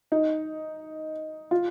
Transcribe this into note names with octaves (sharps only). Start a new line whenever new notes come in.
D#4
F4